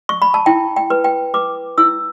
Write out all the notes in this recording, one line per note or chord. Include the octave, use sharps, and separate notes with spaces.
C#6
B5
A5
E4 G5
G5
B4
G5
B4 D6
E4 E6